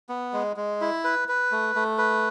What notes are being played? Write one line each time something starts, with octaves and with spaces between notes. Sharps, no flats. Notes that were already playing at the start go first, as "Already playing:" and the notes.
B3
G#3
G#3
E4
B4
B4
A3
A3
B4